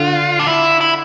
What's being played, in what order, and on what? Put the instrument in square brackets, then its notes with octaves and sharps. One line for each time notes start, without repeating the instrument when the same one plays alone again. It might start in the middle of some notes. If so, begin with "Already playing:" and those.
Already playing: [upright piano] D3 [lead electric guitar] F4
[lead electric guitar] D4
E4
E4